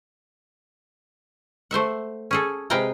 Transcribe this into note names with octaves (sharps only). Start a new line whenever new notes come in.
A3 C5 E5 F#5
C#4 G#4 A4
C3 G#3 B4 F5 G5 A#5